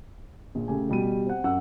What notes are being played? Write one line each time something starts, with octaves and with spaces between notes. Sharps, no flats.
A#1
C#3 A3 G4 G#5
B2 G3 F#4 D#7
C4 F#5
F#2 F#5 E6